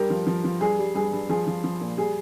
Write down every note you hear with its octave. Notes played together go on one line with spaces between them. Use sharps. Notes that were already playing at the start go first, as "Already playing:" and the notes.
Already playing: G2 G4 A#4
F3
F3
F3
G2 G#4
G3
G2 G#4
G2
F3 G#4
F3
F3
A#2
G3 G#4